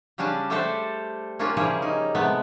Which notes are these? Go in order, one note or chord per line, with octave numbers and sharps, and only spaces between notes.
C#3 G3 C#4 D4 A5
G3 A3 D4 G4 A4 C5
A#3 C#4 D4 F4 C#5 G5
C#3 F3 G3 E4 G#4 C#5
D#4
C3 G#3 A3 B3